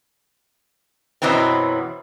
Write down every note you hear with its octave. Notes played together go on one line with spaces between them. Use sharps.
F#2 B2 E3 F#3 B3 C4